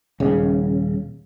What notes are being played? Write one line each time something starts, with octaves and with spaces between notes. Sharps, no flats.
D#1 C#3